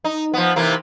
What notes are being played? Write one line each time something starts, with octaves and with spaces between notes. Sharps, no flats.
D#4
F3 B3
C3 E3 A#3